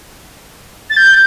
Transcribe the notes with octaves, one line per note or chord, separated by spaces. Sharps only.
A6
G6